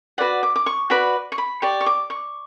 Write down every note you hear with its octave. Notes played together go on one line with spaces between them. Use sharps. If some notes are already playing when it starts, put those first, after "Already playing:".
F#4 B4 D5 F#5
D6
D6
C#6
F#4 B4 D5 B5
C#6
B5
G4 D5 C#6
C#6
D6
C#6